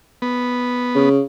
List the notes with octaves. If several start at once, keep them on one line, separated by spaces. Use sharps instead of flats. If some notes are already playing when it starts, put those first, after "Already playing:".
B3
C#3